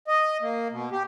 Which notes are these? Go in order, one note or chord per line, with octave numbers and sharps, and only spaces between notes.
D#5
A#3
B2
G4